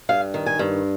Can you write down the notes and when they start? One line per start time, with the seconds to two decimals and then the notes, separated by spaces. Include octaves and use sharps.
0.09 G2 F5
0.34 D#3
0.46 G#5
0.59 G2